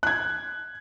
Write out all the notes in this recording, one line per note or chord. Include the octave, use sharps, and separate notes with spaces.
F#6 G#6